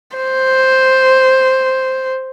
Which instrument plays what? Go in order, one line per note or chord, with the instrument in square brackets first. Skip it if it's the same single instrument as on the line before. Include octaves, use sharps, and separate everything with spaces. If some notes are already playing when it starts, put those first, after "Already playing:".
[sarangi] C5